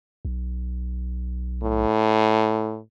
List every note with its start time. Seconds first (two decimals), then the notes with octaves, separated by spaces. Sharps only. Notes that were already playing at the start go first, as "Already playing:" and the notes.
0.25 B1
1.63 A2